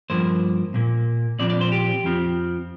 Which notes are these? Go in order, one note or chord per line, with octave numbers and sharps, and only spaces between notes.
G2 F3 A#3 C5
A#2 A#3
A#2 F3 C4 D5
D5
C5
G4
F2 F3 C4